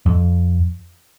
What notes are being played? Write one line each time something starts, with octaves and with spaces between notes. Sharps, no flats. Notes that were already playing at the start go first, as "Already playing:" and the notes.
F2